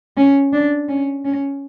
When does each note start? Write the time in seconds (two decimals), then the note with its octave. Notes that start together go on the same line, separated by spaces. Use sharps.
0.17 C#4
0.53 D4
0.89 C#4
1.25 C#4